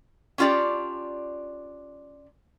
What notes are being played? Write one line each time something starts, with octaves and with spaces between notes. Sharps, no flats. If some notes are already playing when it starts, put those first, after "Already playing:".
C#4 D4 F4 G4 D5